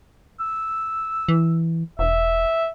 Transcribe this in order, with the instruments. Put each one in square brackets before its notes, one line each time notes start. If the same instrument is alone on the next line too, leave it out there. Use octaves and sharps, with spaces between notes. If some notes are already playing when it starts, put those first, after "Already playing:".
[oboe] E6
[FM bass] E3
[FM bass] E1 [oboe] E5